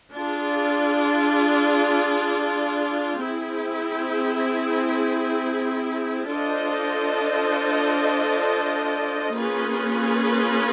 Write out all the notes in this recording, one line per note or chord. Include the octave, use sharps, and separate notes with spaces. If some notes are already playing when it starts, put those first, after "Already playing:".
D4 F4 G#4
C4 E4 G#4
D4 F4 A4 C5 D#5
A#3 C#4 F4 G#4 B4